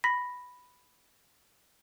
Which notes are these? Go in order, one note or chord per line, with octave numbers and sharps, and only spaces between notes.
B5 A#6 B6